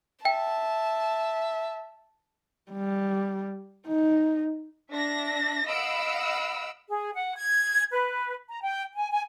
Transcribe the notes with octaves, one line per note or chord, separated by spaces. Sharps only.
E5 G5 A5
G3
D#4
D4 E5 A#6
D#5 F5 F#5 B5 E6 D7
G#4
F#5
G#6
B4
A#5
G5
G#5
G#5